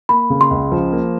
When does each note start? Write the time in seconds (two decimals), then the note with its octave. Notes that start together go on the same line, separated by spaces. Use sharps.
0.09 A#3 B5
0.30 C#3
0.41 C6
0.51 C#2
0.72 F3
0.92 A#3